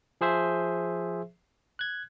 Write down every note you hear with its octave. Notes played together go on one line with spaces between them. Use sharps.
F3 G#4 C5 E5
F#6 G#6